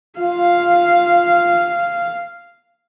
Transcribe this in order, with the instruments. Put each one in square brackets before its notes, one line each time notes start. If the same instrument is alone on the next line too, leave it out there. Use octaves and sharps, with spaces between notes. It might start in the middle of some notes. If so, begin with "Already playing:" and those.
[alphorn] F4 [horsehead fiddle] F5